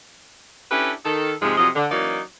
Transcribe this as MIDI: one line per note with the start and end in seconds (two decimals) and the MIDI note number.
0.71 0.93 61
0.71 0.93 62
0.71 0.93 64
0.71 0.93 67
0.71 0.93 69
0.71 0.93 71
1.05 1.33 51
1.05 1.33 69
1.42 1.56 44
1.42 1.56 48
1.42 1.56 53
1.42 1.56 56
1.58 1.69 41
1.58 1.69 48
1.58 1.69 53
1.58 1.69 54
1.58 1.69 75
1.75 1.85 50
1.91 2.21 52
1.91 2.21 54
1.91 2.21 58
1.91 2.21 61
1.91 2.21 63
1.91 2.21 74